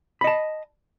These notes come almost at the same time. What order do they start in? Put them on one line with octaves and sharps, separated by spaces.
B5 D#5 A5